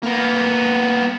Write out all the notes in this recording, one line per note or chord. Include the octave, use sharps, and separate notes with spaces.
A#3 B3